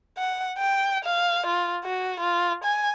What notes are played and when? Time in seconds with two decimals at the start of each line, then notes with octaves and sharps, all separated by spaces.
0.18 F#5
0.59 G5
1.04 F5
1.46 F4
1.84 F#4
2.20 F4
2.64 G#5